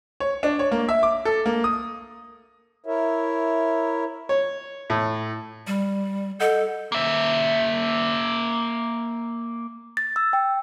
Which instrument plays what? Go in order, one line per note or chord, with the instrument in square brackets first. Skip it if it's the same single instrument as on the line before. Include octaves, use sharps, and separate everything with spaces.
[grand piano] C#5
D4
C#5
A#3
E5
D6
A4
A#3
D#6
[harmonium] E4 A#4 C#5 E5
[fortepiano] C#5
A2
[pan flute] G3
[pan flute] A4 [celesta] D#5 F#5 G6
[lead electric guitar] A#3 E5
[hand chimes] A6
E6
G5